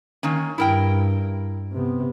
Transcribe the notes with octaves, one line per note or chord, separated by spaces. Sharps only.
D#3 A#3 C#4
G2 E4 A#4 G5
C3 B3